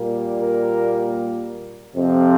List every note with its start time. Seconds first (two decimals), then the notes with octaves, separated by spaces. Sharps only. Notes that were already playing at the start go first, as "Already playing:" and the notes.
Already playing: A#2 G3 A#3
0.41 A#4
1.95 F2 C3 F3 C4